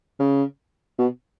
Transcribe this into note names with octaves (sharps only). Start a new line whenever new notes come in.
C#3
B2